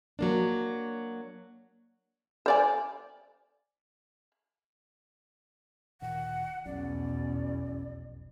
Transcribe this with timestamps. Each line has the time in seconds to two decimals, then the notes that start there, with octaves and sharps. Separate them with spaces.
0.19 F#3 A#3 D4
2.46 C5 D5 G#5
6.01 D1 A#2 D#3 F#5
6.66 F1 B1 E2 B2 F#3 C#4 D5